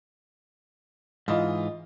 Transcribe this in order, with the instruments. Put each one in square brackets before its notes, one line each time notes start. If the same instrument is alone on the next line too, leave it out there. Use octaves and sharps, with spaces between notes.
[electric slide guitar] G#2 E3 [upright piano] F4 D#5